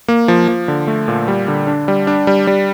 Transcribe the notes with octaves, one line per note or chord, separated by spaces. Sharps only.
A#3
F3
F3
D3
A3
A#2
G3
D3
D4
G3
D4
G3
G3